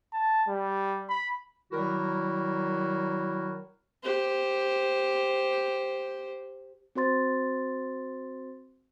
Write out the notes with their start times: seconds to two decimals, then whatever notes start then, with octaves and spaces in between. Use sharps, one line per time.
0.13 A5
0.48 G3
1.09 B5
1.72 D#3 F#3 G3 E4 F#4 A#4
4.03 G4 C5
6.95 C4 F#4 C5 C6 A6